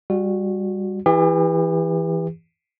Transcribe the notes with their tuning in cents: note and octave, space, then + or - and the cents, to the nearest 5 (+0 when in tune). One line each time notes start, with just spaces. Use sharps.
G3 +20 F#4 -15
E3 +0 G4 +40